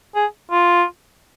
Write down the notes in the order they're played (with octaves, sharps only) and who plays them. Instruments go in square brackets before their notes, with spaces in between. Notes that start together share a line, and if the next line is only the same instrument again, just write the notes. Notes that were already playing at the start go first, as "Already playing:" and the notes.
[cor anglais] G#4
F4